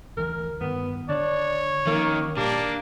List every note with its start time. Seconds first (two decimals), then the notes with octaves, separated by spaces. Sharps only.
0.17 D2 E3 A#4
0.61 G2 D#3 B3
1.09 D3 D4 C#5
1.87 D#3 F3 A3 A#3 C#4
2.37 A#2 G3 A#3 D4